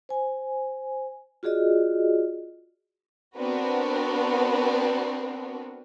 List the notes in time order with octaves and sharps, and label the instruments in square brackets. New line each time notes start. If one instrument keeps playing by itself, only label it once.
[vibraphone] C5 G#5
F4 F#4 G#4 D5 D#5
[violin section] B3 C4 D4 F#4 A#4 B4